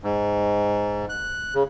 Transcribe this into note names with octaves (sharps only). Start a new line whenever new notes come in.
G#2
F#6
C#3